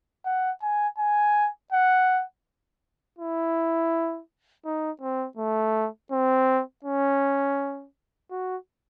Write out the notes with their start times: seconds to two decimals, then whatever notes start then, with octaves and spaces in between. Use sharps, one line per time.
0.26 F#5
0.62 G#5
0.98 G#5
1.72 F#5
3.19 E4
4.65 D#4
5.01 C4
5.37 A3
6.12 C4
6.84 C#4
8.31 F#4